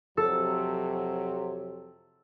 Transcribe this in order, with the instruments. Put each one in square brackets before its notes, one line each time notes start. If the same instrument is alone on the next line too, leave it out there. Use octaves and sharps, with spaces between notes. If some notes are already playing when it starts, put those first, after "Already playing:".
[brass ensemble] F2 C3 F#3 [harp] A4